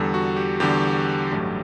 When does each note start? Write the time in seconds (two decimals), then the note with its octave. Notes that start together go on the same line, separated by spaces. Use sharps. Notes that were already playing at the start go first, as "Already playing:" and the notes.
Already playing: E2 D3 G3 A4
0.14 F#4
0.36 G4
0.60 E2 D3 G3 G4
1.32 A1 G2 F#3 A3